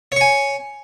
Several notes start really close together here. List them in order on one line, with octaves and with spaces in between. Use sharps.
C#5 C#6 G#5